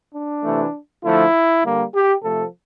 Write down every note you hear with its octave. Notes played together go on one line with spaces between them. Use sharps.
D4
C3 E3 A3
D3 F3 A3 E4
D3 G3 A#3
G4
C3 F3 A3 A4